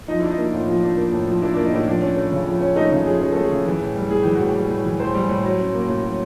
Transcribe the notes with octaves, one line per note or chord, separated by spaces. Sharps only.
F3 D#4
E4
D4
D#4
A#3 E4
A2 F4
F3
D4
A#3
A2
F3
D4 E4
D4
A#3
D#4
A2 E4
F3 D4
C#4
A3
C#3
F3
C#4
A3 D#4
C#3 D#4
F3 G#4
C#4 G#4
A3 A4
G#4
C#3
E3
A2
G3
A2 G#4
E3 G4
F#4
A2
G4
G3
A2
E3
A2 C5
G3
A2
F#3
C#4
A#3
A2
F#3